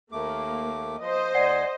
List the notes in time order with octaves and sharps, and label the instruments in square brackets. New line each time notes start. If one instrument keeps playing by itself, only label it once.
[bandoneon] D#2 A3 D6 [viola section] A#3
[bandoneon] F3 [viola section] C5 D#5
[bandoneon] D2 G#5 [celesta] D5 F#5 C7